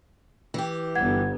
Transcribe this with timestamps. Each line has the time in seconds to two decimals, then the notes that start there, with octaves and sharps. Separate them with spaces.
0.54 E3 G4
0.95 G1 G2 B3 F#5 G#6